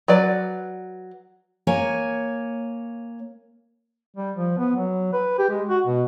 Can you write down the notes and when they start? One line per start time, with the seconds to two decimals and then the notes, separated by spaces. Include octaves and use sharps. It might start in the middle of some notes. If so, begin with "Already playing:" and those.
0.08 F#3 B4 D5
1.67 A#3 C#5 G#5
4.16 G3
4.36 F3
4.58 B3
4.76 F#3
5.13 B4
5.38 G4
5.50 G#3
5.69 F#4
5.86 B2